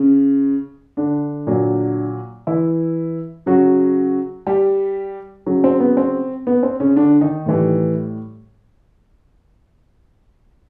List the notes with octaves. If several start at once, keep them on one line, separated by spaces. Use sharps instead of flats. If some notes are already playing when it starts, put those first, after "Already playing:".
Already playing: C#3 C#4
D3 D4
A#2 F#3
E3 E4
C#3 F#3 F#4
G3 G4
C#3 F#3
C4
B3
C4
B3
C4
C#3 C#4
D3 D4
D#3 D#4
A2 E3 G3